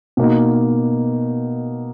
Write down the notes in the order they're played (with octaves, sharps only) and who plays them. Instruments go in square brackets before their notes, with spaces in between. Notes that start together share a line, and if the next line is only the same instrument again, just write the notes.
[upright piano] B2 A#3 D#4